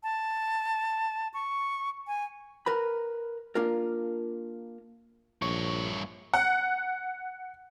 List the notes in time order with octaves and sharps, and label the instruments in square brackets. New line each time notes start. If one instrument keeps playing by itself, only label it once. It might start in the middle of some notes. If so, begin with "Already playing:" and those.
[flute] A5
C#6
G#5
[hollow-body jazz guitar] A#4 B4 B5
A#3 D4 F4 A#4
[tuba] A#1 [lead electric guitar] G2 C#5 [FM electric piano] C#6
[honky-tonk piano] F#5